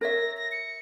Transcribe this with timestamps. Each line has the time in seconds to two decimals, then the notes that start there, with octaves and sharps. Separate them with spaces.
0.01 A#4 C#5 E5 A#6
0.37 A#6
0.52 C#7